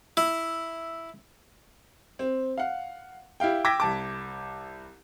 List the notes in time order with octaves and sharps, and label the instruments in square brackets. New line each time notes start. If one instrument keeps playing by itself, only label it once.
[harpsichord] E4
[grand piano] C4
F5 F#5
E4 G4 F5 G5
G5 D6 E6 G#6 A#6 B6
C2 A5 D6